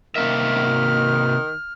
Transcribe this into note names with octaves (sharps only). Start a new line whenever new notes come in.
C3 D#3 A#3 E5 F6